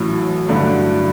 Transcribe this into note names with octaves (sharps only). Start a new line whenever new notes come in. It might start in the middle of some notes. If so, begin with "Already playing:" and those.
Already playing: A1 A2 F#3
G2 D3 F#3 A3 D4